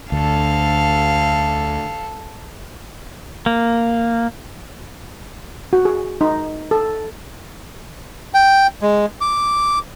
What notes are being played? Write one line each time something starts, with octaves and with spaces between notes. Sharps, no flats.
D2 A4 F5
A#3
F#4
G#4
D#4
A4
G5
G#3
D6